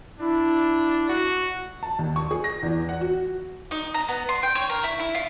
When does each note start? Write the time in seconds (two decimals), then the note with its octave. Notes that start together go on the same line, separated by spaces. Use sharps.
0.20 D4 E4
1.09 F#4
1.83 A5
1.99 D#2
2.16 C#6
2.31 G#4
2.44 A#6
2.63 E2
2.89 F#5
3.01 F#4
3.71 D#4
3.94 A#5
4.08 B3
4.29 C6
4.43 G5
4.55 C#5
4.70 A#4
4.83 E4
5.00 E4
5.15 F4